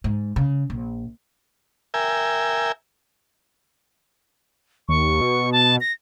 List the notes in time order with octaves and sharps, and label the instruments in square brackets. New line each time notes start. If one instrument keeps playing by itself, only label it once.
[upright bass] G#2
C#3
A#1
[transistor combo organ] A#4 E5 G5 G#5
[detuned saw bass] D#2 [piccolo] C#6
[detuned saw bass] B2
[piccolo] A5
A#6